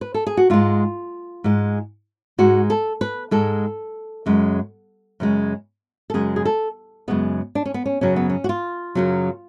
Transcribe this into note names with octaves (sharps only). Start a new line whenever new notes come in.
B4
A4
G#4
F#4
G#2 G#3 F4
G#2 G#3
G#2 G#3 F#4
A4
B4
G#2 G#3 A4
F#2 C#3 G#3
F#2 C#3 G#3
A4
F#2 C#3 G#3 G#4
G#4
A4
F#2 C#3 G#3 B3
D4
C#4
B3
C#4
F#2 C#3 F#3 C#4
B3
C#4
F#4
F4
F#2 C#3 F#3